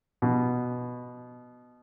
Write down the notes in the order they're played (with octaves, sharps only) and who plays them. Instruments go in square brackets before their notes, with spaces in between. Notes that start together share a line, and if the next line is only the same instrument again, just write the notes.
[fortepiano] B2